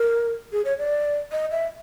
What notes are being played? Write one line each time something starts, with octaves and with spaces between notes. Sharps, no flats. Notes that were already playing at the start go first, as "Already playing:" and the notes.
Already playing: A#4
G#4
C#5
D5
D#5
E5